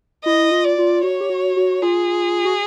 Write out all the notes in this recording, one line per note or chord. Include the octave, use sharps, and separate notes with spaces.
E4 D#5
F4
D5
F4
F#4 C#5
G4
F#4
F#4
F4 G#4
F#4